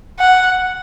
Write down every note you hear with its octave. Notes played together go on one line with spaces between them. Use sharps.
F#5